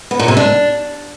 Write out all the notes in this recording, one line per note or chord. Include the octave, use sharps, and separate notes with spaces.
B3
A#2
C3
D4